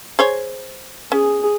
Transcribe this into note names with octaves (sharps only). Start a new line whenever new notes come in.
G#4 C5 C#5
C#4 G#4